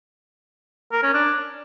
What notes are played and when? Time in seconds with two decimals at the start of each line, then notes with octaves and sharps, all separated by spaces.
0.92 A#4
1.03 C#4
1.14 D4